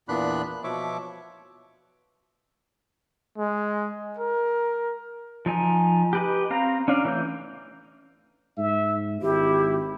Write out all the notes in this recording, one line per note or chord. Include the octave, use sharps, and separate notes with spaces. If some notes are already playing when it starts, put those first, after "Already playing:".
E2 A#2 B3 D4 B5 F#6
B2 F3 C#5 E5 D6
G#3
A#4
F3 D#4 G#5
G4 B4 D#5
C4 F5 A#5
C#4 D4 F5
E3 A3 G6
G#2 E5
G#1 E4 G4